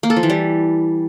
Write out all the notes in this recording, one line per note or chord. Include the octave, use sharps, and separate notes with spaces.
A#3
A4
F3
E3
G3